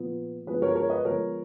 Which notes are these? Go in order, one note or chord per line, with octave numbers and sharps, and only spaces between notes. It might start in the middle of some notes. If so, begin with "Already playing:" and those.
Already playing: A#2 F3 B3
F3 G#3 B3 G#4 B4
A#4 C#5
A#4 C#5
B4 D#5
F3 G#3 B3 A#4 C#5